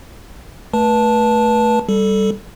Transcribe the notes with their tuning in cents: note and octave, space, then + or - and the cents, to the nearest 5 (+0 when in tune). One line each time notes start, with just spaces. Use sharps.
A3 +0 B4 -30 A5 +0
G3 +0 A4 +0